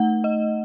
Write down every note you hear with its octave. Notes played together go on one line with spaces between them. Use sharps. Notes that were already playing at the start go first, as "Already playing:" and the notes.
Already playing: A3 D#4 F#5
D#5